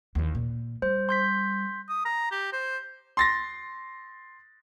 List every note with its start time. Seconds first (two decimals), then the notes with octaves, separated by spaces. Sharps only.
0.15 D#2 E3
0.35 A#2
0.82 G3 C5
1.09 C6 G6 B6
1.89 D#6
2.05 A#5
2.31 G4
2.52 C5
3.17 C6 A6 A#6